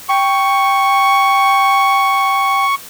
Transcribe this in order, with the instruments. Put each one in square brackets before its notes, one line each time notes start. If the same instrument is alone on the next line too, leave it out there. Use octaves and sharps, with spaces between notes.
[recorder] G5 [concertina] C#6